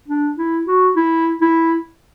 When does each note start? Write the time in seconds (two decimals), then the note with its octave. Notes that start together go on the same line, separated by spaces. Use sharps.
0.08 D4
0.38 E4
0.67 F#4
0.96 E4
1.41 E4